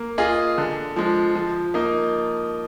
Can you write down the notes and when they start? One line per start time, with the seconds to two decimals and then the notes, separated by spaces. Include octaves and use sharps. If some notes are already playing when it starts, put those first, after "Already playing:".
Already playing: A#3
0.18 F4 G#4 D#5
0.58 D3
0.96 F3 G#3
1.35 F3
1.74 A#3 D#4